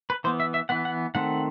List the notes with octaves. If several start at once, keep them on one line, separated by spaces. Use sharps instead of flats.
B4
E3 B3 C5
E5
E5
E3 B3 F#5
F#5
D#3 A3 C4 F#5